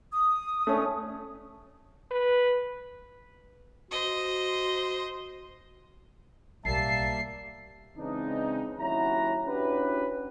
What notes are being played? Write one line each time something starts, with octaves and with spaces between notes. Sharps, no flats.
D#6
A3 C#4 D4
B4
F#4 C5 D#5
B1 A2 G3 A#3 E5 A5 C7
C#3 E3 G#3 C4 D4 D#4
D#2 F#3 C#4 E4 F#4 A#5
C#4 D4 E4 F#4 G4 B4